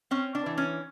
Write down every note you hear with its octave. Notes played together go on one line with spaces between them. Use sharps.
C4 C#4
D4
E3
C#4